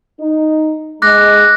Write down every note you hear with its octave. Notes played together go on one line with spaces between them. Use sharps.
D#4
G#3 D6 F#6 A#6